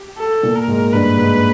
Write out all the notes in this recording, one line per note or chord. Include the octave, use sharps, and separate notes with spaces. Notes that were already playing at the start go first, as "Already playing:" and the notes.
Already playing: G4
A4
A#2
A#4
G#2
G2 B4
G#2